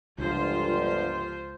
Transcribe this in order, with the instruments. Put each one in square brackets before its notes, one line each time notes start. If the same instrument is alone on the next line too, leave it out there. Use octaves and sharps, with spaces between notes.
[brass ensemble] G1 [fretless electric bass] C#2 [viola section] F3 F4 C5